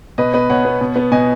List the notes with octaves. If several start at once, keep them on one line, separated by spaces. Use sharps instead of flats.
B2 B4 D#5
B3 B4 D#5
B2 C#5 F#5
B3
B2
B3
B2 D#5 G#5